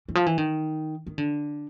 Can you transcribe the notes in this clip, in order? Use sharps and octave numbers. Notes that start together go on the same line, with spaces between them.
E3
F3
E3
D#3
D#3
D3